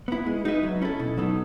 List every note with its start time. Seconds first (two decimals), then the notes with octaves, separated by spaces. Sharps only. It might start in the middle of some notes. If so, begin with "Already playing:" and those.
0.08 B3 E4
0.26 G#3
0.45 D#4 F#4 B4 E5
0.63 F#3
0.82 C#4 E4 A4
0.99 B2
1.17 F#3 B3 D#4 A4